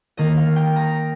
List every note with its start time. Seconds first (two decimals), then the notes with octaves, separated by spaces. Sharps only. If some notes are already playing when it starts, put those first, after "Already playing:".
0.17 D#3 A#3 D#4 D#5
0.37 F5
0.56 G5
0.76 A#5